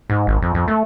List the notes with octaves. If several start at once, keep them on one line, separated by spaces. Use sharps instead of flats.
G#2
G#1
F2
F2
A3